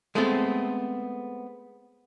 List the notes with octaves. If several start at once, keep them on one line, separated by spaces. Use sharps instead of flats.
G#3 A3 B3 C4 A4